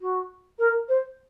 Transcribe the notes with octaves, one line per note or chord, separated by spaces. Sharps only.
F#4
A#4
C5